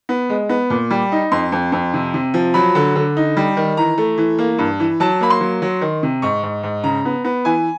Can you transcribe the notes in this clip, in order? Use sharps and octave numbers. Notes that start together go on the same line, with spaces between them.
B3
G#3
B3
A#2
G3
D#4
F2 C6
F2
F2
C3
C3
F3
F#3 B5
D3
D3
D#4
G3
D#3
E3 A#5
A3
E3
A#3
G2
E3
F#3 A5
A#3 B5
C6
F#3
F#3
D#3
C3
G#2 C#6
G#2
G#2
C#3 A#5
B3
B3
E3 G#5